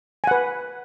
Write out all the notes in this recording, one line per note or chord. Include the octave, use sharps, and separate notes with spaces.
B4 F#5 G#5